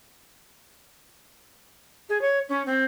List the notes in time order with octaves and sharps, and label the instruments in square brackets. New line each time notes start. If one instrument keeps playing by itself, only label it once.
[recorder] G#4
C#5
C#4
C4